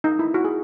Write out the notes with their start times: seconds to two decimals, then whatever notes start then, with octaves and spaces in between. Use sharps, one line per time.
0.04 D#4
0.19 E4
0.34 F#4
0.45 G#4